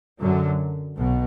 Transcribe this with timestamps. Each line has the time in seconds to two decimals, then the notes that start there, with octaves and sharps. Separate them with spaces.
0.20 F#2 D3 F#3
0.95 B1 B2